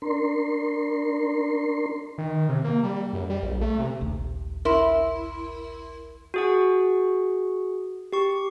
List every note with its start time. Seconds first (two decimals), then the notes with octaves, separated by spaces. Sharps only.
0.02 D4 A#4 C6
2.18 D#3
2.49 C3
2.64 A#3
2.84 G3
3.13 F#2
3.30 G3
3.43 A#1
3.61 A3
3.79 C3
4.00 D#1 A#1 D#2
4.65 E4 A#4 C6
6.34 F#4 G#4 F#5
8.13 G4 C#6